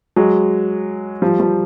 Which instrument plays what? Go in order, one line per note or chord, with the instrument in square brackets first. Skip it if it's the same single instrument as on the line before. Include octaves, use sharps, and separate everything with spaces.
[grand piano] F#3 G#3
F3 G3
F3 G3